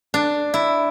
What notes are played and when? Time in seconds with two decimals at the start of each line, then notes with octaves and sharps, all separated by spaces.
0.14 D4
0.54 E4